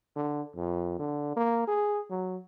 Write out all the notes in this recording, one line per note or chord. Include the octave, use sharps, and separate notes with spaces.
D3
F2
D3
A#3
G#4
F#3